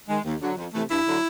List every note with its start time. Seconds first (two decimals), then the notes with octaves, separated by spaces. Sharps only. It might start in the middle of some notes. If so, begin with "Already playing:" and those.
0.08 D#3 G#3
0.25 D#2
0.41 D3 F#3
0.57 F2
0.73 C3 E3 A3
0.89 G2 E4
1.05 D3 F#3